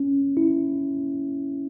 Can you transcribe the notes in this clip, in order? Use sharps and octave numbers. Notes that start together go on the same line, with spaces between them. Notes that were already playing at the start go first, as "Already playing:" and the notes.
Already playing: C#4
E4